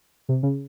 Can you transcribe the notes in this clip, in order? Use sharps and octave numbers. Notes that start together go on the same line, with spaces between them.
C3
C#3